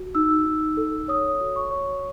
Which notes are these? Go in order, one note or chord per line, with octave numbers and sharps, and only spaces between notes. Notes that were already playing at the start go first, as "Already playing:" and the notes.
Already playing: F#4
D#4 E6
D#4
A4
C#5 D#6
F#4
C#6
C#5